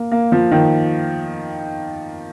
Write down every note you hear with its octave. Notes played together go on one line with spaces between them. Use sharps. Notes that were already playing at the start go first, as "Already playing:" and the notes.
Already playing: A#3
A#3
F3
D#3